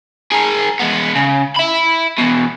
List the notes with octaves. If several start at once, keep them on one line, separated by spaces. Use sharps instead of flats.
G#4 A#4
G#3 B3
C#3
E5 B5
E2 B2